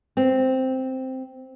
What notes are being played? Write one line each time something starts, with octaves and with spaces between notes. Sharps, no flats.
C4